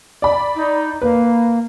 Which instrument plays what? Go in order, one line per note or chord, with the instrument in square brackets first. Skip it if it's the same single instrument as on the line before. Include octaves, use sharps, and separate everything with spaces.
[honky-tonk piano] D5 B5
[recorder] D#4
[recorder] A#3 [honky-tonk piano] B4